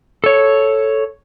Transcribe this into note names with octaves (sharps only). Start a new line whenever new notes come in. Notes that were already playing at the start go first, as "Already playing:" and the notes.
A4 C#5